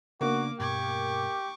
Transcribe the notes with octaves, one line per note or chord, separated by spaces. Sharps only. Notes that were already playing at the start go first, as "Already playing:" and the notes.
C#3 A#3 B3 D4 F#4 D6
G2 B2 G4 C#6 D6 G#6